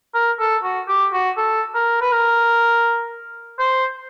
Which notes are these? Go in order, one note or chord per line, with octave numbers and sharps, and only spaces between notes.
A#4
A4
F#4
G4
F#4
A4
A#4
B4
A#4
C5